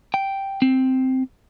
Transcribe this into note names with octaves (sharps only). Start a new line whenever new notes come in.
G5
C4